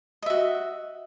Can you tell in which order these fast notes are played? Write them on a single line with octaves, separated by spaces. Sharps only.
D#5 E5 F#4